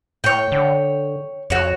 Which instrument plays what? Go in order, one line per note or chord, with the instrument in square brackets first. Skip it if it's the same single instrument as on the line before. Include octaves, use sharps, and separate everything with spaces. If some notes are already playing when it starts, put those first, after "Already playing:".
[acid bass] A2 [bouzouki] C#5 G5
[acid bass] D3
[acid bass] F2 [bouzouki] F#4 C#5